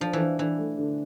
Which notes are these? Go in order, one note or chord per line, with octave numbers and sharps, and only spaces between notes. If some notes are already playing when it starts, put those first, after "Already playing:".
F3 D4
E3
D4
E3 D4
A3
D3